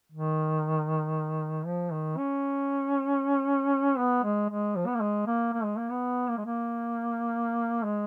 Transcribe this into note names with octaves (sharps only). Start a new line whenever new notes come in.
D#3
F3
D#3
C#4
B3
G#3
G#3
F3
B3
A#3
G#3
A#3
A#3
G#3
A#3
B3
A#3
G#3
A#3
G#3